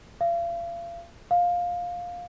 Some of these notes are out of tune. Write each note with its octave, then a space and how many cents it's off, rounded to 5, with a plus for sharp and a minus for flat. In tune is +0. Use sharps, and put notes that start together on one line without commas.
F5 -40
F5 +10